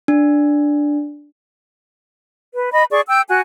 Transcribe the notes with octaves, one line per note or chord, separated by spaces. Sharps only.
D4
B4
D#5 B5
G#4 D5 C#6
G5 E6 G6
F#4 G#5 F#6